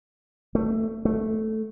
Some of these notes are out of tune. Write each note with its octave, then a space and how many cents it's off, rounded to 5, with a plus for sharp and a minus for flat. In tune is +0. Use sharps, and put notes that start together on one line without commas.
A3 +15
A3 -5